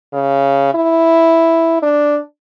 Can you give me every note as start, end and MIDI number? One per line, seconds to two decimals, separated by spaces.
0.13 0.73 49
0.74 1.82 64
1.82 2.18 62